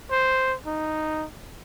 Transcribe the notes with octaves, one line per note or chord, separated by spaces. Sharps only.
C5
D#4